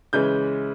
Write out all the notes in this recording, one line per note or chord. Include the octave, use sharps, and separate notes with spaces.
C#3 E3 G#3 C#4 G6